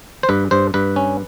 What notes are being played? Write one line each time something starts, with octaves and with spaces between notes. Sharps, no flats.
C5
G2 B4
G2 C5
G2 B4
C#4